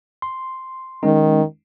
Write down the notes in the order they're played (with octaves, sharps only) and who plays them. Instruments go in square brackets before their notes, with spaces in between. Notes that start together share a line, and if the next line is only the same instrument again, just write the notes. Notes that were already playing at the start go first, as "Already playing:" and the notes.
[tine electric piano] C6
[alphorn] D#3 [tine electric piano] G#3 C#4 D#4